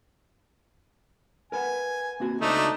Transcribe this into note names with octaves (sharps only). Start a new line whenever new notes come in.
A#4 B4 F#5 G#5
A#3 C4 F#4
C#2 A3 D4 D#4 F#4 C5